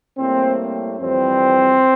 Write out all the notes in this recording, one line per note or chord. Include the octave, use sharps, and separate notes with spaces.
A2 G3 A#3 C4
F2 E3 G3 C4